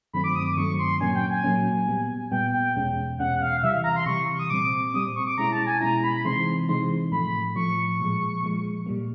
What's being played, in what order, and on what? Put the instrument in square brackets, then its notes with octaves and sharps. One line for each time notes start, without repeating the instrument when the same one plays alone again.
[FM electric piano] G2 D#3 F#3 A3 C4 [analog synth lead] B5
[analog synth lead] D6
D#6
D6
[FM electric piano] G2 D#3 F#3 A3 C4 [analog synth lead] C#6
[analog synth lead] C6
[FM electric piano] A#2 F#3 A#3 C#4 [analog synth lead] G#5
[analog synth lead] G5
G#5
[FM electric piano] A#2 F#3 A#3 C#4
A#2 G3 B3
[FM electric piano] A#2 G3 B3 [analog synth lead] G5
[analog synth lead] G5
[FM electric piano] E2 B2 G#3 C#4
[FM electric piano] E2 B2 G#3 C#4 [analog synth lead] F#5
[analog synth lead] F5
[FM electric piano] C3 E3 G3 [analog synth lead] E5
[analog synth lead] F5
A#5
C6
[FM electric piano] C3 E3 G3 [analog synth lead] C#6
[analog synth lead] D#6
[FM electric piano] A#2 G3 C4 [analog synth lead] D6
[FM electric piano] A#2 G3 C4 [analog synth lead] D#6
[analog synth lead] C#6
D6
[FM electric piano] B2 G#3 C#4 E4 [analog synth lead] A#5
[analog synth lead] A5
G#5
[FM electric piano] B2 G#3 C#4 E4 [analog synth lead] A#5
[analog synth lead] B5
[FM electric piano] C3 E3 G#3 C4 D#4 [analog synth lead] C6
[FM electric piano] C3 E3 G#3 C4 D#4 [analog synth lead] C6
[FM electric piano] A2 F3 A3 [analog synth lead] B5
[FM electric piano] A2 F3 A3 [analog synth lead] C#6
[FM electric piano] A#2 F3 G#3
A#2 F3 G#3
A#2 G3 A#3